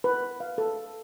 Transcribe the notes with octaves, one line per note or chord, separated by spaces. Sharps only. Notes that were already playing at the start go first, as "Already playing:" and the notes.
B4
F5
A4